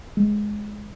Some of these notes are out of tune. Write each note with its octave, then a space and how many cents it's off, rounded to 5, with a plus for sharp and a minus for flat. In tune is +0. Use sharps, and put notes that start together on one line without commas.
G#3 +5